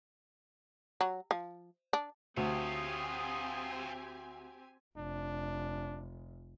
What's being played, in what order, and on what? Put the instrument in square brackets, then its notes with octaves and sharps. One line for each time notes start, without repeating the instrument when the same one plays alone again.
[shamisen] F#3
F3
D4
[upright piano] D2 [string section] C4 G4 G#5 [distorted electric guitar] F4 C#5 [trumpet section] D#6
[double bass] F1 [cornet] D4